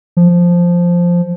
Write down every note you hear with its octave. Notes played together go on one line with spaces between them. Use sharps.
F3